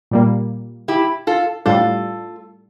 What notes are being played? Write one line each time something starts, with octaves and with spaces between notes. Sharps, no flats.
A#2 G3 A#3
E4 G4
F4 A4
A2 G3 D4 F4 G4 A4